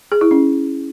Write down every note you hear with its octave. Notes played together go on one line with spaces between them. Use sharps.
G#4
E4
C#4